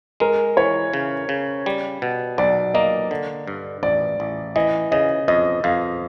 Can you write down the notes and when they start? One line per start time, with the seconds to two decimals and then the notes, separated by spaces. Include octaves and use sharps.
0.20 G#3 A#4
0.57 E3 C#5
0.94 C#3
1.29 C#3
1.66 G3
2.02 B2
2.38 B1 D5
2.74 A#3 D#5
3.11 D3
3.47 G2
3.83 A1 D5
4.20 A1
4.56 E3 D#5
4.92 C#3 D#5
5.28 F2 D#5
5.64 F2 F5